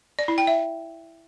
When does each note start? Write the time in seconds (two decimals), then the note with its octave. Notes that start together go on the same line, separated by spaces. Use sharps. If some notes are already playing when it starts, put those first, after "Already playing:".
0.19 D5
0.28 E4
0.38 G5
0.47 E5